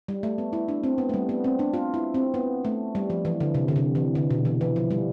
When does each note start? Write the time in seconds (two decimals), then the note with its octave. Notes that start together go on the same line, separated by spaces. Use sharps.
0.08 G3
0.23 A3
0.38 B3
0.53 E4
0.68 D4
0.84 C4
0.98 B3
1.09 A3
1.14 G3
1.29 B3
1.44 C4
1.59 D4
1.74 F4
1.94 E4
2.14 C4
2.34 B3
2.65 A3
2.95 G3
3.10 F3
3.25 E3
3.40 D3
3.55 C3
3.68 D3
3.76 C3
3.95 E3
4.15 D3
4.31 B2
4.45 E3
4.61 E3
4.76 F3
4.91 G3